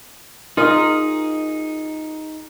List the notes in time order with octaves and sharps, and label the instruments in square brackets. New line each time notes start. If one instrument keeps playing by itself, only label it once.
[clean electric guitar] D#4 G#4 [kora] F4 A#4 D#5